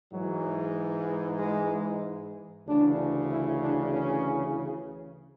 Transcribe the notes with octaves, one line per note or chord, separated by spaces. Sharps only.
G#2 E3 F#3
G#3
D2 C#3 E3 D4
E4
D4
C#4